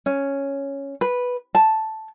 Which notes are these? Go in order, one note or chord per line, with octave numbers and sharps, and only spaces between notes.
C#4
B4
A5